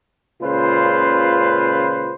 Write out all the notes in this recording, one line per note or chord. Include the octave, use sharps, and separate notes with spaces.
C#2 A#2 C#3 F4 B4 C5